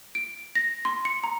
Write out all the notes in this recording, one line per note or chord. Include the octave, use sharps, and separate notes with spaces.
D7
A#6
C6
C#7
A#5